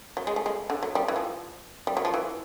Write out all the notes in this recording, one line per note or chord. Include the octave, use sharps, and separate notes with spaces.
F#3
G#3
A3
G#3
D3
F#3
G3
E3
F3
G3
F#3
F3
E3